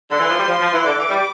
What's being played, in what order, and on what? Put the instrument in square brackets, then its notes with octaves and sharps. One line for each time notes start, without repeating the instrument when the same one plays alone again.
[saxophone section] D3 [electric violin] C6
[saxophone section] E3
F3
G3
F3
F3
E3
[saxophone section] D3 [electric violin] D6
[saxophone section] E3
G3